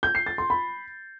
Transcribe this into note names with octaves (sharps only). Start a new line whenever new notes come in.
G6
C7
A6
C6
B5